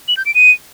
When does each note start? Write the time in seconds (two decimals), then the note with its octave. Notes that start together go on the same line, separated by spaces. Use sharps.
0.08 F#7
0.17 G6
0.26 D7
0.35 D#7